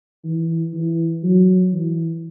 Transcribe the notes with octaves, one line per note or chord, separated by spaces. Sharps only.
E3
E3
F#3
E3